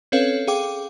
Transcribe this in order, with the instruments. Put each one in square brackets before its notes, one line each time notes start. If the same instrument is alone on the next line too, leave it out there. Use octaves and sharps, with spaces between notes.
[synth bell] C4 C#4 A4 B4 C#5 F5
G#4 F5 G5 D6